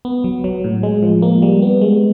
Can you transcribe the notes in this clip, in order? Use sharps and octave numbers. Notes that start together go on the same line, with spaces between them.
B3
F#3
F#3
A2
G#3
F3
A#3
G3
B3
G#3